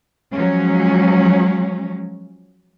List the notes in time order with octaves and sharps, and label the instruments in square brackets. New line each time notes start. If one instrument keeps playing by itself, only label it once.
[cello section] F3 F#3 G#3 C#4